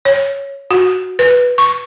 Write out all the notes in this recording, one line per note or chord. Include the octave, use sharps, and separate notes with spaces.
C#5
F#4
B4
C#6